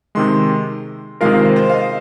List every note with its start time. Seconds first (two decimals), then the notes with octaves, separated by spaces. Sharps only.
0.15 C3 D#3 G#3 C6
1.21 C3 D#3 G#3 F4 A#4 F5
1.39 C5
1.56 C5
1.69 F5
1.74 D#5